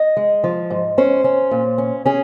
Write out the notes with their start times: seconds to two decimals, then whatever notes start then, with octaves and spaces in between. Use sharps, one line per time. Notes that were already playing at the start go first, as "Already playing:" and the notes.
Already playing: D#5
0.17 G#3
0.44 F3
0.70 G#2
0.98 C#4 C5
1.24 C#4
1.51 A#2
1.78 C#4
2.06 C#4 G#4